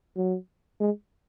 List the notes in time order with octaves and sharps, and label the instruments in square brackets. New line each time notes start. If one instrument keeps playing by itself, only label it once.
[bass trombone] F#3
G#3